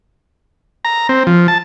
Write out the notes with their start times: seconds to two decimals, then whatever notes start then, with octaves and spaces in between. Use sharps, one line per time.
0.85 A#5
1.09 C4
1.27 F3
1.48 A5